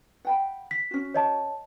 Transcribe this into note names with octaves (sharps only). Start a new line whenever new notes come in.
F#5 G5 B5
B6
C#4 F#4
C#5 D#5 A5